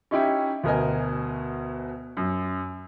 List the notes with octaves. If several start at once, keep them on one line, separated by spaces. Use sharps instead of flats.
C#4 D#4 E4 G4
D2 B2 A#4 D#5 G#5
F#2